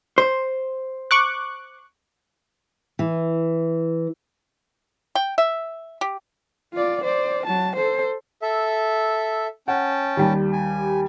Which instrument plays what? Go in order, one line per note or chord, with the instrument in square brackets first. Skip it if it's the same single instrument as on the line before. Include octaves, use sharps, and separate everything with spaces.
[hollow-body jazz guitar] C5
[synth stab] C#6 D6 F#6
[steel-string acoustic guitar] E3
[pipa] G5
E5
G4
[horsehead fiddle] F4 D5
C5 D5
F#3 A5
A4 C5
[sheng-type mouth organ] A4 E5
[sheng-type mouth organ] C#4 G5 A5 [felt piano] F#5
[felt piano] D#2 G3
[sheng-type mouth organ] G#5